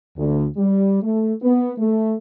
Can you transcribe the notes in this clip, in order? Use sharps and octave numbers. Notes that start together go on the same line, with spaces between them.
D2
G3
A3
B3
A3